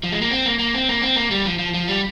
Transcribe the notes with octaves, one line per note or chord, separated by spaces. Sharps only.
F3
G#3
A#3
C4
A#3
A#3
C4
A#3
C4
A#3
G3
F3
F3
F3
G3